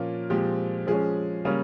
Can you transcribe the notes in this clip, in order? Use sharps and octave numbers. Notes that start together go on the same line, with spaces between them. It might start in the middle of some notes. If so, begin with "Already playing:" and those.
Already playing: A#2 F3 A#3 C#4 F4
A#2 F3 G#3 C4 G4
F3 G#3 C#4 G#4
C#3 G3 A#3 C#4